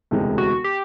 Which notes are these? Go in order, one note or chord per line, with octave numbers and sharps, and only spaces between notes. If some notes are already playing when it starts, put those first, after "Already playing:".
E1 D2 C3 E3 G#3
F#4
G4